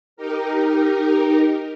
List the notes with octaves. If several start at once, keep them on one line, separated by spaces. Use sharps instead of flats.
D#4 G4 A#4